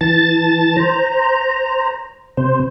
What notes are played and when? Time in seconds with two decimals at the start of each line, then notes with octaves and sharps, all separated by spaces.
0.01 E3 A5 A6
0.77 C5 A#5
2.37 C3 C5